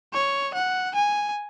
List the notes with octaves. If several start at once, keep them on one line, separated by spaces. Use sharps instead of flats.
C#5
F#5
G#5